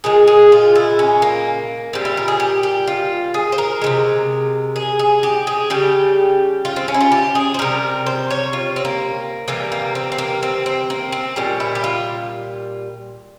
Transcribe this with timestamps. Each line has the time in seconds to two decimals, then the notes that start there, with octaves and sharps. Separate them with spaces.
0.04 A#2 G#3 G#4
0.27 G#4
0.52 F4
0.75 E4
0.99 C#4
1.22 A#3
1.93 A#2 G3 C4
2.05 E4
2.17 A#4
2.28 G#4
2.40 G4
2.63 G4
2.87 F4
3.34 G#4
3.52 C5
3.58 A#4
3.82 C3 E3 G#3
4.76 G#4
4.99 G#4
5.23 G4
5.47 G#4
5.70 C#3 G3 G4
6.65 F4
6.76 C4
6.88 C#4
6.94 E4
7.01 F4
7.12 G4
7.35 G#4
7.54 C5
7.59 C3 G3 A#4
8.06 C5
8.31 C#5
8.53 F4
8.76 C4
8.85 A#3
9.48 C3 E3 G3 A#3
9.72 A#3
9.95 C4
10.12 C4
10.18 A#3
10.43 C4
10.66 C4
10.90 A#3
11.12 C4
11.36 A#2 G3 C#4
11.60 E4
11.75 G4
11.84 F4